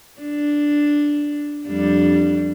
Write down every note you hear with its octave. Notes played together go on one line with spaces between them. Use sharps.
D4
F2 G3 D4